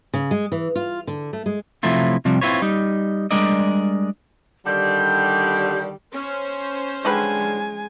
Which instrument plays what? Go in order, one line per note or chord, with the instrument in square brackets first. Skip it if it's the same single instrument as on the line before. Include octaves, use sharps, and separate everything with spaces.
[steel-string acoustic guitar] C#3
G#3
E3
F4
D3
A3
G#3
[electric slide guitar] C3 F3 F#3 A3 E4 F4
C3 F3 G3
C4 E4 F4 B4 C#5
G3 D#4
G3 G#3 D4 A#4 D5 D#5
[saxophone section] D3 D#3 G3 [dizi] G6
[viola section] C#4 C5
[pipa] D3 G3 B4 [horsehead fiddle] G#3 G#5